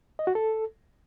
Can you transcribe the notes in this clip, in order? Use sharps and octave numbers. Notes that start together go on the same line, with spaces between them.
D#5
F#4
A4